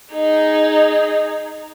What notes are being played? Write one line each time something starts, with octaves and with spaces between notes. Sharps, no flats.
D#4 G#4